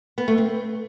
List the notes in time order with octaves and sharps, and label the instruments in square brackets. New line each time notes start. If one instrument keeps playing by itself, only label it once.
[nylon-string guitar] B3
A3
C4